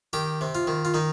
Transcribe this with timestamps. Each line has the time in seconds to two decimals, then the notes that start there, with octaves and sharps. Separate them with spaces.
0.13 D#3 G4
0.41 C3
0.55 F4
0.67 D#3
0.85 F4
0.94 D#3 D#4